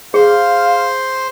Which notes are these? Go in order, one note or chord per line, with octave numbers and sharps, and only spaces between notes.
G#4 C5 F5